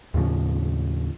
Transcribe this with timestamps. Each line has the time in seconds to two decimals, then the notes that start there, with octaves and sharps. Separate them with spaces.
0.14 D#2 A2 C#3 F3